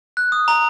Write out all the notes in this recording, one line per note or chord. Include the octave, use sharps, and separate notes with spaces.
F#6
D#6
A#5